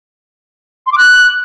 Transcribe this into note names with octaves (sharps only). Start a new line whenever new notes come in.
C6
D6
F#6